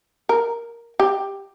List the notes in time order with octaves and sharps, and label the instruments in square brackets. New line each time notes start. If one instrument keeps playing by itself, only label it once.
[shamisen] A#4
G4